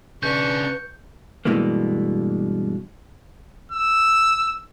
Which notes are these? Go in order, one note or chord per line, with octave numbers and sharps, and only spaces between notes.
C#3 D4 B4 C#6 G6
G2 B2 E3 G#3 A#3
E6